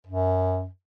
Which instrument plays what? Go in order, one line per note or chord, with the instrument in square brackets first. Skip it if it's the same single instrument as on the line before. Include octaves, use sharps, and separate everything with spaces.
[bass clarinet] F#2